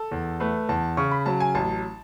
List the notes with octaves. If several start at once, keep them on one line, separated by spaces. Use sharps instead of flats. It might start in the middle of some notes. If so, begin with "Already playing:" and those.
Already playing: A4
E2
A3 B4
E2 A5
C#3 C#6
B5
F#3 A5
G#5
A1 A5